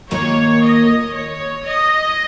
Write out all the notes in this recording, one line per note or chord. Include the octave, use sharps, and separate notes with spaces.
D#2 D#3 A#3 F4 A#4 C#5
D#5
C#5
D#5